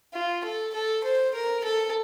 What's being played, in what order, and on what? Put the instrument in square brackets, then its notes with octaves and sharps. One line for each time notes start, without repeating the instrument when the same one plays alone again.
[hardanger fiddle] F4
A4
A4
C5
A#4
A4